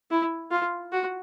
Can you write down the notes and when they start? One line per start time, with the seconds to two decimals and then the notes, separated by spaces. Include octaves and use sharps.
0.11 E4
0.51 F4
0.92 F#4